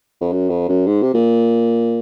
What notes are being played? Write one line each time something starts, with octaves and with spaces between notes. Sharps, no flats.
F2
F#2
F2
F#2
G#2
C3
A#2